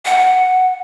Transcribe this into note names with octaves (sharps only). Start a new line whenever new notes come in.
F#5